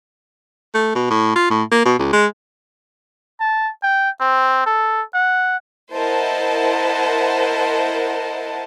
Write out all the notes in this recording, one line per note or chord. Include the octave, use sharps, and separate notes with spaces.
A3
B2
A2
F4
A2
A#3
B2
C#2
G#3
A5
G5
C4
A4
F#5
E4 A#4 C5 D#5 F#5 A5